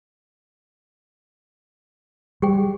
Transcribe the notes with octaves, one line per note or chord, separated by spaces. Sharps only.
G3 G4 G#4 G5